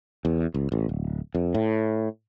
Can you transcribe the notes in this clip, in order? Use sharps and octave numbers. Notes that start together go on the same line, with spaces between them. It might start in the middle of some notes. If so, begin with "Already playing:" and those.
E2
C#2
A1
D1
F2
A2